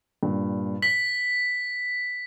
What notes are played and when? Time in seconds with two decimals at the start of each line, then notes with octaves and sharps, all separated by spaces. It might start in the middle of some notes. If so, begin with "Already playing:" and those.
0.23 G2 A#2
0.82 B6 F#7